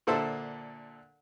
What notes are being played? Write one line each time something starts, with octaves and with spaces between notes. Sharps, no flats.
A#2 D3 A4 C5 E5 A5